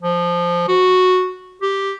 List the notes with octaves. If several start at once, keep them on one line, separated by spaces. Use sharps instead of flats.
F3
F#4
G4